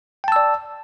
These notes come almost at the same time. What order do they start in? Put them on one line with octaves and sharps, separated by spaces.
G5 A5 E6 D5